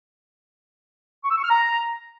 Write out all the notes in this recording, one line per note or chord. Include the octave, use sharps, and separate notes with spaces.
C#6
E6
C#6
F6
A#5